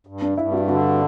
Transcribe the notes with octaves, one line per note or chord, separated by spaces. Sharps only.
G2
D4
G2 E4
F#4
D3 F#4